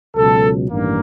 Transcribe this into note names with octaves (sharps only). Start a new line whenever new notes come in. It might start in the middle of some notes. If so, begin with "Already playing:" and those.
C#2 B2 F#3 A4
A1 G2 D#3 G3 A#3